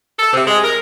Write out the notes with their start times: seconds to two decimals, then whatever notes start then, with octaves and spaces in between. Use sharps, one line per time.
0.19 A4
0.33 C3
0.47 G#3
0.64 A#4